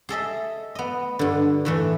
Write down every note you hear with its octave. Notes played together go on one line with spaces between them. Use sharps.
G#4 A4 D#5 E5
B3 D#5
G2 D3
A2 E3 A3